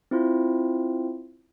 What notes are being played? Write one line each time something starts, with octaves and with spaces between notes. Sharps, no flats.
C4 E4 F4